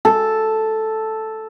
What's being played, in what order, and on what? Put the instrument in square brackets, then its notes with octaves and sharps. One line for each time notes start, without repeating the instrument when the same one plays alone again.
[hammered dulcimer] A4